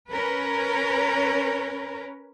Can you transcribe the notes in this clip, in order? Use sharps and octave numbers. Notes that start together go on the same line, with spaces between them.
C#4 A#4 B4